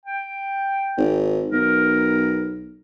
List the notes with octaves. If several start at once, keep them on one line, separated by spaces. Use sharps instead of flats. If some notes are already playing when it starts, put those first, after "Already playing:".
G5
G#1
B1 A#4